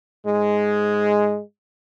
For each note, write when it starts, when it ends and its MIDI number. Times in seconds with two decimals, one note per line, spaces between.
0.24 1.39 44
0.24 1.39 56